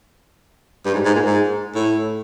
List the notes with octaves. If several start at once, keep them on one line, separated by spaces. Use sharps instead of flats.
G2
G#2
G#2
A#2
G#2
A2